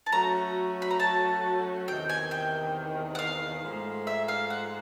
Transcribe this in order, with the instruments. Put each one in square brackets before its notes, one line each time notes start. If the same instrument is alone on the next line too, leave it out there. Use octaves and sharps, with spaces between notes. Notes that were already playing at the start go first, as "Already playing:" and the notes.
[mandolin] A5
[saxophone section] F#3 A3 C#4 F#4 [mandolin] A#5
[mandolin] B5
A#5
A5
[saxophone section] E2 C3 D#3 [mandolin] G5
[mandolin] G#5
G5
F#5
F5
[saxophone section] G#2 F3 A3
[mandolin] E5
F5
F#5